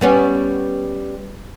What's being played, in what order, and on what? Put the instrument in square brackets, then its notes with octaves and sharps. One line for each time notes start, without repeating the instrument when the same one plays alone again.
[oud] G3 B3 C#4